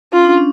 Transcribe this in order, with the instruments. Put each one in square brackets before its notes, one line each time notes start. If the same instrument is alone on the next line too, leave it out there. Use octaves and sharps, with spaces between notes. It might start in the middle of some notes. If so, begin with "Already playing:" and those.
[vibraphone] C#4 [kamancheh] F4
[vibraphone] D4
C#4